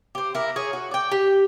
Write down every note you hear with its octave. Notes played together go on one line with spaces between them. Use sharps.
G4 C5
E4 A#4
G#4 C#5
F#4
D5 G5
G4